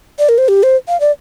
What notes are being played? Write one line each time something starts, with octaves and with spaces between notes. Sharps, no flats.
D5
A#4
C5
G4
C5
F5
D5